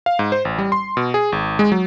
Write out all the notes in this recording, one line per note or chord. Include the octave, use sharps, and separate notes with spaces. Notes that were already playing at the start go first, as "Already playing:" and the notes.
F5
G#2
C5
A1
G3
C6
B2
G#4
G#1
G#3
F#3